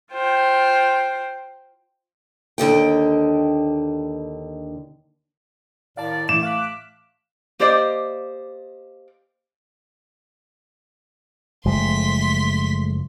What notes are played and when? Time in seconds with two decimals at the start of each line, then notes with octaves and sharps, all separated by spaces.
0.14 F4 C5 G5
2.58 D#2 D3 D#5 G5
5.97 A2 D#3 D5 F5 A5
6.29 A2 E3 A3 D6 E7
6.43 F5 F#6 B6
7.59 A#3 G4 C5 D5 D#5
11.66 F#1 F3 G#3 A3 C6 B6